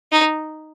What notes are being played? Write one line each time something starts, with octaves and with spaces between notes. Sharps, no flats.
D#4